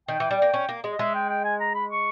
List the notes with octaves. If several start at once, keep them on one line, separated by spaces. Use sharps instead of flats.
D#3 G5
E3
G3
A#3
C#4
A#3
G#3
D#5
G#3 E5
G5
G5
G#5
A#5
B5
C#6